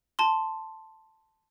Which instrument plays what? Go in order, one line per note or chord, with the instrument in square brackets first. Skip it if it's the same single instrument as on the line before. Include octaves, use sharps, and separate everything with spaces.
[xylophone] A5 C6